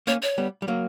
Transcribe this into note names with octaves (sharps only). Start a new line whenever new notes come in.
A#3 C#4 C#5
C#5
G3 B3
G3
F#3 A#3